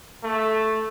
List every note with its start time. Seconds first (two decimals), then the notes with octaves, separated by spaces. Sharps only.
0.24 A3